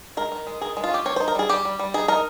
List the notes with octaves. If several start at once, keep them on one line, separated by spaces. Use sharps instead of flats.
G#3 A#4
D#3
G#3
D#3 G#4
G#3
F4
C#4 G4
C4 C#5
D#4 C5
A#4
G3 G#4
G3 G4
G3
G3
D#4 G#4
D#4 A#4